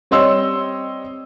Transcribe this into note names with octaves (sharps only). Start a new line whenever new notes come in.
G3 C4 C#5 D#5 C6 E6